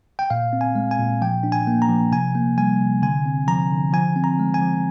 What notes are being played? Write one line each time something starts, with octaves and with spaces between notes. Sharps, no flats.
G5
A#2 F5
C4
G#5
G#3
G#5
A#2
F3 G5
D4
G#5
A#3
A#5
F3
C3 G#5
A#3
G3 G#5
C3
D3 G#5
C4
F3 A#5
D3
F3 G#5
C4
A#5
G#3
G#5
F3